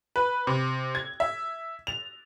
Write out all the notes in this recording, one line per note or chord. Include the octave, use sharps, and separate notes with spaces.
B4
C3
G#6
E5
F7